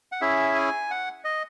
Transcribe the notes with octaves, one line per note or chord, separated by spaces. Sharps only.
F#5
C#4 E4 G#4 E5
G#5
F#5
D#5